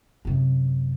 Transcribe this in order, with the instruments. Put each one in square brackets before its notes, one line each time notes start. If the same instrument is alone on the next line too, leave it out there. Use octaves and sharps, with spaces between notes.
[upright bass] F#2 C3